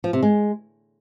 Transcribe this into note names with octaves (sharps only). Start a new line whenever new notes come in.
F3
C3
G#3